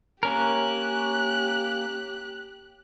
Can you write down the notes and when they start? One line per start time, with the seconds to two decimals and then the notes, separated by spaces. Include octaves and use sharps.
0.23 A#3 C#4 G4 A#4 F#6